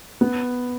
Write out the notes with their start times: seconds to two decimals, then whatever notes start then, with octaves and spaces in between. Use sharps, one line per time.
0.21 B3